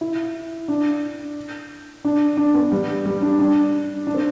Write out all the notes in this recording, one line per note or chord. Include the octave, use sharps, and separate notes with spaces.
E4
D4
D4
D4
B3
G3
G3
D4
D4
D4
C4